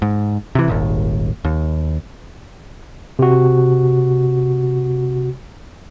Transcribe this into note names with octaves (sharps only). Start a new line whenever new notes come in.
G#2
C3 E3
D#1 G#1 D#2
D#2
C3 F#4